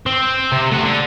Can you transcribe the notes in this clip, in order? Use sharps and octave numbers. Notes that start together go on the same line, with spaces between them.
C4
C3
A3 F#5
D3